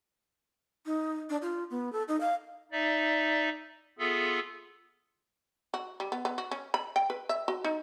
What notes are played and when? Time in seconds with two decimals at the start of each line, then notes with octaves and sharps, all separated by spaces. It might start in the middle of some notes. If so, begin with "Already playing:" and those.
0.86 D#4
1.30 D4
1.42 F4
1.70 B3
1.93 A4
2.08 D#4
2.21 F5
2.72 D#4 D5 E5
3.99 B3 F4 G#4 A4 E5
5.74 F#4
6.00 G3
6.12 B3
6.25 B3
6.38 F#4
6.51 C#4
6.74 B5
6.96 G5
7.10 B4
7.29 E5
7.48 F#4
7.64 D#4